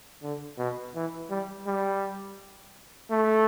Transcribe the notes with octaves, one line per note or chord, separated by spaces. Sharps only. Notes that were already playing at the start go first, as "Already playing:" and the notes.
D3
B2
E3
G3
G3
A3